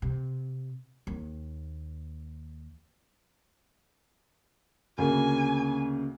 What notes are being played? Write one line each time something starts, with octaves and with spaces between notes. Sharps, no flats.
C3
D#2
D2 C#3 A#3 G#5